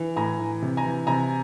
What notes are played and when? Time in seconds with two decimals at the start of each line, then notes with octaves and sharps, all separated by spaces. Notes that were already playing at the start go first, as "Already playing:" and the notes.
Already playing: E3
0.16 A2 G#5 A#5
0.39 E3
0.62 C3
0.77 G#5 A#5
0.84 E3
1.07 C3 G#5 A#5